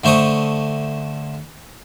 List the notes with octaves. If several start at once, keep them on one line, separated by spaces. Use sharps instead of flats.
D3 A3 C5 C#6 D#6